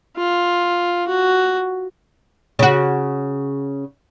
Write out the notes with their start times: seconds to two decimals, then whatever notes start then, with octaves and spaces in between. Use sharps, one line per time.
0.17 F4
1.08 F#4
2.59 C#3 F#4